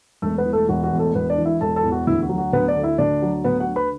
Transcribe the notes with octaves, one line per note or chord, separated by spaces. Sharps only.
E1 A3 A4
B3 B4
E3
A3 A4
E1 F#4
F#4
E2
A3 A4
E1 B3 B4
D4 D5
E3
E4 E5
E1 A4 A5
A4 A5
E2
F#4
D2 E4
F#4
F#3
F#4
D2 B3 B4
D4 D5
D3
E4 E5
D2 D4 D5
F#3
D2 B3 B4
F#4 F#5
D3
B4 B5